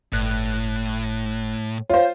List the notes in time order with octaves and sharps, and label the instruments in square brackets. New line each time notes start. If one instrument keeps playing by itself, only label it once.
[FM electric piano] G1 F#6 [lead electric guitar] A2
[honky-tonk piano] F4 C5 [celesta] C#5 F5